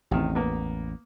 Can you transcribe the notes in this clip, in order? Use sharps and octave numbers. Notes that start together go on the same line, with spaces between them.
A1 E2 C3 D#3
A#3 B3